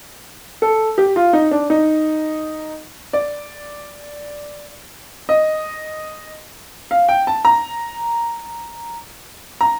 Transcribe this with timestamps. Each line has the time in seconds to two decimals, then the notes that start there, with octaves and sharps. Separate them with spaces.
0.62 A4
0.98 G4
1.16 F4
1.33 D#4
1.51 D4
1.70 D#4
3.13 D5
5.29 D#5
6.91 F5
7.09 G5
7.27 A5
7.45 A#5
9.61 A#5